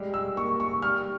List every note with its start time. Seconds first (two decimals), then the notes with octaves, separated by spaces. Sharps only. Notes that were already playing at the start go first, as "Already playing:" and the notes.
Already playing: G3 G#3
0.14 E6
0.36 A#3 C#6
0.60 C#6
0.82 G3 F6